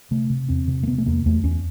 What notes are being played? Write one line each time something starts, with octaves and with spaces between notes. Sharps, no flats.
C3 A3
C3
E2 C4
C3
A#3
C3 B3
A3
E2 A#3
E2 A3
E2 C#4